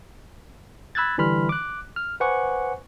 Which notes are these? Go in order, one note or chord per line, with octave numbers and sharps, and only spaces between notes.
B5 E6 F#6 G#6 A6
D3 E3 G3 B5 C6 F6
D6 F#6
F6
B4 C5 F#5 G#5 C#6 D6